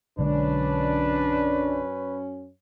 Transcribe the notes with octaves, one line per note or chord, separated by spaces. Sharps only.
B1 F#2 D3 G#3 C#4 D4 B4